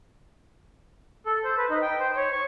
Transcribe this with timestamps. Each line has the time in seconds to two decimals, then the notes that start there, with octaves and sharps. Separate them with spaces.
1.26 A4
1.44 C5
1.57 B4
1.70 D#4
1.82 G5
1.99 C5
2.17 C#5
2.32 C#6